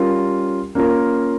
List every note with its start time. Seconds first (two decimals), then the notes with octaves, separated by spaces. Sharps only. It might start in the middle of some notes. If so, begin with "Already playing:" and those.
Already playing: G3 C#4 F4 A#4
0.75 A#3 C#4 F4 A#4